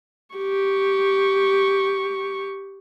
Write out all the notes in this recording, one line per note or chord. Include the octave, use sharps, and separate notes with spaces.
G4 C#6